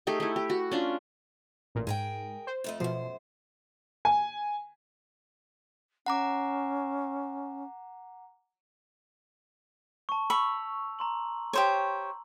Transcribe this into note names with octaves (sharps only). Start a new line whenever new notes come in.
A3 D#4 G4 G#4
A3 E4
G4
F#4
C#4 D4 F4
A1 A#2
G#2 G#4 A#4 G5
C5
F2 A3 D#5
F#2 B2 F3 C5
G#5
C#4 F#5 A#5 D6
A5 C#6
B5 C#6 E6 F7
A#5 C6 F#7
G4 C5 C#5